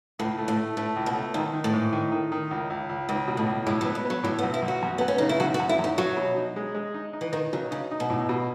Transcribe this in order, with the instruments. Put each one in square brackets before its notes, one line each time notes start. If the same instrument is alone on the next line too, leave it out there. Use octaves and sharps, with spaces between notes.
[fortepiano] C#2 [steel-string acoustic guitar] A2
[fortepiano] A3
[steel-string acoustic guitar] A2
[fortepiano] A3
[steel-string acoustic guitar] A2 [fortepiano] A3
[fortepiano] C#2
[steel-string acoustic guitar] B2
[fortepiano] A3
[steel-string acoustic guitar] G#2 [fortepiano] D#3
[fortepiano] D#3
[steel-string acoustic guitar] A2
[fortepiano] G#2
D#3
D#3
D#3
C#2
C#2
C#2
[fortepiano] C#2 [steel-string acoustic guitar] G#2
[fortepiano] B2
[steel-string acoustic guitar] A2
[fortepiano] C#2
[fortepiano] A2 [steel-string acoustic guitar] G#3
[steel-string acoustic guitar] F#3
[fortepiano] B3
[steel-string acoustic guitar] G#3
[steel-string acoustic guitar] F#3 [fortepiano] B3
[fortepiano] A2 [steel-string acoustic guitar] F#3
[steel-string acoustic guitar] B3
[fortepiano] B1
[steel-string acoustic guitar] E4
[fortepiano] B1
[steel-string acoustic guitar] F#4
[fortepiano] F#2
[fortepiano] F#2 [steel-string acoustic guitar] B3
[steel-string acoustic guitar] C#4
[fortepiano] C#3 [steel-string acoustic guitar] D#4
[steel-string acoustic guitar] E4
[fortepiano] F#2 [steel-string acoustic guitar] F#4
[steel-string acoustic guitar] F#4
[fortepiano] F#2
[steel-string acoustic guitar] E4
[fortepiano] F#2 [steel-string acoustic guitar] D#4
[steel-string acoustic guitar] F#3 [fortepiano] F#4
[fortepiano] B2
D#4
G#3
G#3
D#4
D#4
[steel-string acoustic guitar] E3
[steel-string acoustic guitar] D#3 [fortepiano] D#4
[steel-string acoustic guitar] C#3 [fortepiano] F#3
[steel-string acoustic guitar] C#3 [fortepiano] D#4
[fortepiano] D#4
[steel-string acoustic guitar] B2
[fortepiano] A2
B2